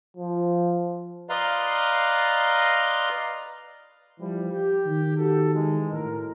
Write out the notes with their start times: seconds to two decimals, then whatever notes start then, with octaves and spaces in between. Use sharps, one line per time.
0.17 F3
1.29 B4 D5 D#5 F5 A#5 C6
4.19 E3 F3 G3
4.52 G4
4.86 D#3
5.17 F#4 G4 A4
5.54 E3 G#3
5.93 A2 F#4 A#4